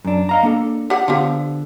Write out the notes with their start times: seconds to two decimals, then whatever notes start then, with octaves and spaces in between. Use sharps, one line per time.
0.05 F#2 D4
0.29 D#5 F5 A#5
0.43 A#3 D4 A4
0.90 G4 F#5
1.08 D3 F3 B3 G4